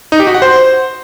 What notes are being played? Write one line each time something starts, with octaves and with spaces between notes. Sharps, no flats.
D#4
G4
F#4
F#5
C5